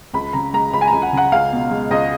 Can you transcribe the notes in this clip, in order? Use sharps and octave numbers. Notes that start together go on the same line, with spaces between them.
C#2 B5
C#3 A#5
G#3 A#5
C#2 B5
G#5
C#2 A#5
F#5
C#3 F#5
C#2 F5
B2
G#3
C#2 D#5